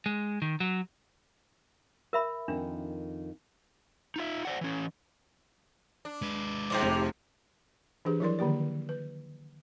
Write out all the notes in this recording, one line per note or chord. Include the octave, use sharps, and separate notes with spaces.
G#3
D#3
F#3
A#4 E5 B5
F2 D#3 D4
D#4 F4 E5
C5 D5 F#5
E3 C#4
D4
G#3 B4
G#2 C3 F3 G4 C5 D5
F1
E3 D4 G4 G#4 B4
F3 F#3 E4 A#4 D5 C6
D3 D#3 A#3 G4 D5
B4